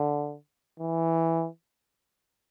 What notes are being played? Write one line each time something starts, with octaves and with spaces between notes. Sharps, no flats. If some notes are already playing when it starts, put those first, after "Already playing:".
Already playing: D3
E3